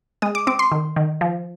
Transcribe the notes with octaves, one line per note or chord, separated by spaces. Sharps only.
G#3 D#6
D6
C4 D6
C6
D#3
D#3
F3